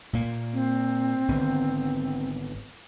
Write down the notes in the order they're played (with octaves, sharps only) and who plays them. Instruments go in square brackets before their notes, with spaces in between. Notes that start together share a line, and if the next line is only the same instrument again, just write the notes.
[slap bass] A#2 A#3
[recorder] C4
[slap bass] G#1 D3 B3